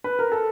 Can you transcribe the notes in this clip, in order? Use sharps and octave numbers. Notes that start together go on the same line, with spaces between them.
B4
A#4
A4